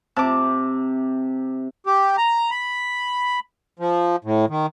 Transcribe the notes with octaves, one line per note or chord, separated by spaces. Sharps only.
C3 A5 D6
G4
A#5
B5
F3
A2
D#3